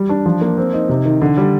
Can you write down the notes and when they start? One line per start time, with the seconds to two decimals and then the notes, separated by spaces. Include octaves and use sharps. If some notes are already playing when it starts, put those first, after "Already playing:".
Already playing: G3
0.09 D4
0.26 F3
0.41 A#3
0.57 C4
0.73 D#4
0.89 C3
1.05 D#3
1.21 D3
1.37 G3